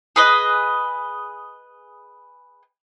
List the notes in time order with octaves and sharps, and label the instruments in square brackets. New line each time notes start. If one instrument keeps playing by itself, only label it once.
[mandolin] G#4 B4 D#5